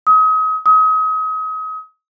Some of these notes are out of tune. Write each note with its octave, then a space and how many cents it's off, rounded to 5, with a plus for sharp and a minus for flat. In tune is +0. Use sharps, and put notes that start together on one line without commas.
D#6 +35
D#6 +35